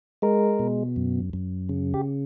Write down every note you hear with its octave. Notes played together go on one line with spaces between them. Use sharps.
G#3 A#4
B2
F#2
F#2
C#3
G4